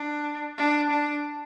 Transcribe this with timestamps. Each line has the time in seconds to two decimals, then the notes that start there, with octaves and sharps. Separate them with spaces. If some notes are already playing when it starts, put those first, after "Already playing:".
Already playing: D4
0.58 D4
0.91 D4